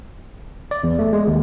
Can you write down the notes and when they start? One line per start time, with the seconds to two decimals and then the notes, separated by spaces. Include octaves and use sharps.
0.71 D5
0.84 E2
0.99 A3
1.13 G#3
1.28 D#2